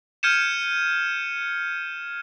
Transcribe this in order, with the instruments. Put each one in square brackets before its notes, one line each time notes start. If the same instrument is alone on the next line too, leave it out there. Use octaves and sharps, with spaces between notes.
[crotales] F6 G6 G#6 C#7 D#7 E7